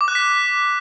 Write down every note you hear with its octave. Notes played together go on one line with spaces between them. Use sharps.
D6
F#6
B6